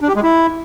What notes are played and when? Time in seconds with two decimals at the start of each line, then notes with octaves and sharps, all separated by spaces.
0.01 D4
0.08 G4
0.16 G#3
0.23 E4